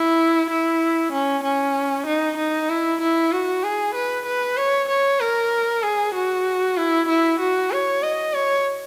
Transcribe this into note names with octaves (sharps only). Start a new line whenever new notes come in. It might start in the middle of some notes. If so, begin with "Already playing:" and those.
Already playing: E4
E4
C#4
C#4
D#4
D#4
E4
E4
F#4
G#4
B4
B4
C#5
C#5
A#4
G#4
F#4
E4
E4
F#4
C#5
D#5
C#5